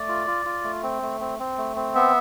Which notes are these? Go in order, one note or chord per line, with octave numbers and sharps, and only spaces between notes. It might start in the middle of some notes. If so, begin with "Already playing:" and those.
Already playing: A3 D5
F4
F4
F4
A3
C4
A3
C4
C4
A3
C4
B3 E5